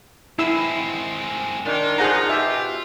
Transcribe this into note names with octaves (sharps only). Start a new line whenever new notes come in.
G#3 C4 E4 E6
D#3 D4 F4
F3 D#4 G#4 F#5 A#5
B2 G4 E5